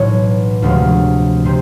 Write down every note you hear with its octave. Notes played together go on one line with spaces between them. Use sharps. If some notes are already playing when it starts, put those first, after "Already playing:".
Already playing: B1 A2 E3 C#5
D2 C3 F3 G#3
C3 C5